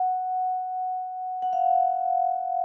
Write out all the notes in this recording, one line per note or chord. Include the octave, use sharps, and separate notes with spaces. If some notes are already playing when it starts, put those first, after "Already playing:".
Already playing: F#5
F#5
F5